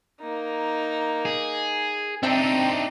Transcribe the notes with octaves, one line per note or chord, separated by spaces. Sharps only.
A#3 D#4
G#4
C4 D4 D#4 E5 G5